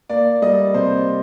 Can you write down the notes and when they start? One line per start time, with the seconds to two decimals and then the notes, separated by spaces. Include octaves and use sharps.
0.09 A#3 D5
0.42 G3 D#5
0.74 C3 C5